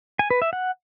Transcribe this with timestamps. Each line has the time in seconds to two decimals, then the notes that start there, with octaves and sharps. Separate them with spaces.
0.19 G#5
0.30 B4
0.42 E5
0.53 F#5